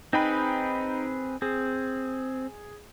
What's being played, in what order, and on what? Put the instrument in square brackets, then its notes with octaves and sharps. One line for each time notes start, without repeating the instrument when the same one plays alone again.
[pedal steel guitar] C4 G#4 B4 [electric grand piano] D#4 G5 B5
[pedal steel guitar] C4 [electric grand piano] G#4